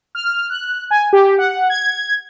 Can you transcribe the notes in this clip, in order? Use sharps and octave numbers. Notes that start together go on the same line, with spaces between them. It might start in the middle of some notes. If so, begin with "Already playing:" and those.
F6
F#6
G#5
G4
F#5
G#6